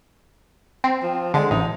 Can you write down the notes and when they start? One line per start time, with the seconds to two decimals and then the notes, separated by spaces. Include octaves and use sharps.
0.84 C4
1.03 F3
1.34 D3 G#3
1.51 A1 D#4